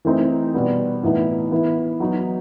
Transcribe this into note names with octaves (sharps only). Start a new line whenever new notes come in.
E3 A3 C4 D#4
B2 G3 B3
A2 E3 B3 D#4
E3 B3 E4
F#3 B3 D#4